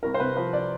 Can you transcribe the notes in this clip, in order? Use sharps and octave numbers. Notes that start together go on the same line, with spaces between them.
C2 A#4
C5
C3 B4
F3 B4
D5